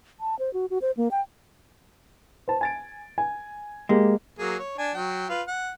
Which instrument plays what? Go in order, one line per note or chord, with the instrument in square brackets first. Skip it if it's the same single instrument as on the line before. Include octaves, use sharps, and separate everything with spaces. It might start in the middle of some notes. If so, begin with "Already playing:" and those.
[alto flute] A5
C5
F#4
F#4
C5
A#3
G5
[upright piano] C5 A5
G#5 A6 D7
G#5
[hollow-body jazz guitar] G#3 [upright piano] A#3 G4
[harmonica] F#3 A#3 G#4
C#5
D4 G#5
F#3 G5
F4 B4
F#5